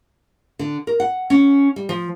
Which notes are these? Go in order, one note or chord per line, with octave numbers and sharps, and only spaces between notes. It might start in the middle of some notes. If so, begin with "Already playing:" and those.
D3
A#4
F#5
C#4
G3
F3